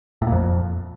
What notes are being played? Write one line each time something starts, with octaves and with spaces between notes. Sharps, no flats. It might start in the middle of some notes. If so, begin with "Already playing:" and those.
A2
A#2
F2